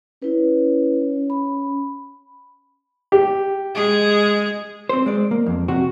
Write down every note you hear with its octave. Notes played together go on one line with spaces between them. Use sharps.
C#4 E4 B4
B5
G4
G#3 G#4
C4 C5
G#3 D5
A#3
F2
C3 F#4